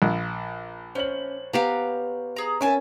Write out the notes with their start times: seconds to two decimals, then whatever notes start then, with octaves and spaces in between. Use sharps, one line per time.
0.02 A#1
0.95 C#4 C5 C#5 F#7
1.53 B3 G4 F5 A#5
2.36 G#4 A#5
2.61 C#4 A#4 E5 G#5 A5